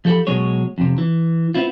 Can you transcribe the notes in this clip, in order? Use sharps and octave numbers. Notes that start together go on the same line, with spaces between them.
F3 G4 A4 G5 B5
B2 F#3 G#3 G#4 C#5
F2 C3
E3
B3 C4 E4 F4